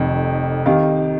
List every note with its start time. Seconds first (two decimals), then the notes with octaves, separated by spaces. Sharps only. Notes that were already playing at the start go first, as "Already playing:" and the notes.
Already playing: F1 F2 D#3
0.66 C3 D#3 F5